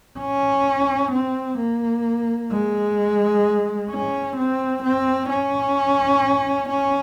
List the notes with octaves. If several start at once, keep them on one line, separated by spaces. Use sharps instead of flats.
C#4
C4
A#3
G#3
C#4
C4
C4
C#4
C#4